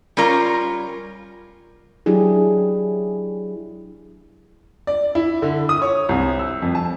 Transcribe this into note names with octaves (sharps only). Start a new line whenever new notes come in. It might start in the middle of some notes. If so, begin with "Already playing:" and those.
G3 C#4 F4 A#4
F#3 D4 E4 G4 G#4
D5
E4
D3
D#6
C#5
C2
E6
F2
A5